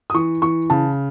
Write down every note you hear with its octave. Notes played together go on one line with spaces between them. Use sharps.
D#6
E3 C#6
E3 C#6
C#3 A5